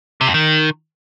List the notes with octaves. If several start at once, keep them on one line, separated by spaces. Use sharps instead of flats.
C3
F2
D#3